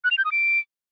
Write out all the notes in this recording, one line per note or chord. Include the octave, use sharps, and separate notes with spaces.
F#6
F7
G6
D#6
D7